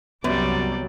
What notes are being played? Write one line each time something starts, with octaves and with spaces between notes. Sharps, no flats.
C2 F#2 F#3 G3 B3 D5